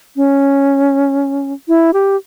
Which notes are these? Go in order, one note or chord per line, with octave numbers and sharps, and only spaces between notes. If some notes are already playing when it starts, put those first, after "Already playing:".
C#4
E4
G4